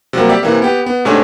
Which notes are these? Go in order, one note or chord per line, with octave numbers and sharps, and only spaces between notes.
C3 F#3 G3 A#3
G4 D5 E5
C3 E3 A#3
B3 G4
B3
G#2 C3 A3 D4 C#5 G#5